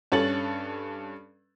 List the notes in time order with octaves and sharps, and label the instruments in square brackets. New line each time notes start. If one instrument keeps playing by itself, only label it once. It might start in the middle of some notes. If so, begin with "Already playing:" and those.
[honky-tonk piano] G2 C#4 A4 A6 F#7